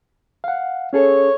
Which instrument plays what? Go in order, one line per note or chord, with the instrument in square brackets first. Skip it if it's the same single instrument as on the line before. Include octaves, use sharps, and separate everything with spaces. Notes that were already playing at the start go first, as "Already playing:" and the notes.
[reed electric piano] F5 F#5
[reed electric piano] C#4 G#4 A4 [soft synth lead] C#5